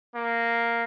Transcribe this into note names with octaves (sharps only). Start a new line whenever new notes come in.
A#3